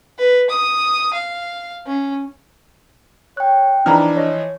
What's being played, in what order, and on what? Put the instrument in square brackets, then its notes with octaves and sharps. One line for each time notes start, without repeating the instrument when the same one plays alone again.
[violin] B4
D#6
F5
C#4
[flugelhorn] C#5 [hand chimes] G5 F#6
[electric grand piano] E3 F3 F6 [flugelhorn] D4 [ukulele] D#4 A#5 B5
[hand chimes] C#5 [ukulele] D#5